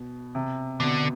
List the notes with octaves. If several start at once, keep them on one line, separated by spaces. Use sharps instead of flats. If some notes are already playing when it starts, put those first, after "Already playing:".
Already playing: B2
C3
B2 D3